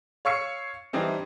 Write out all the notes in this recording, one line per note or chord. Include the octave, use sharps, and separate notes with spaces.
C#5 F5 C#6 E6 C#7
E3 G3 C4 D4 D#4